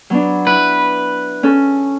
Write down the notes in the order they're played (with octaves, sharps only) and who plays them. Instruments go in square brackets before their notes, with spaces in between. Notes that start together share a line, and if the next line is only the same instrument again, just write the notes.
[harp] F#3 B3 D4
[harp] E4 [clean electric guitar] B4
[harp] C#4 A4